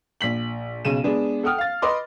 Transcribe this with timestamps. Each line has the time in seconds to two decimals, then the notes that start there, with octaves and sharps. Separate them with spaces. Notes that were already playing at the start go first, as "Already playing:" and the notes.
0.21 A#1 B6 F#7
0.85 B1 C#3 D#7 E7
1.04 G#3 B3 D4 G#4
1.43 A4 F#5 G5 D#6 F6
1.58 F5 A6
1.82 B4 D#5 C6 D6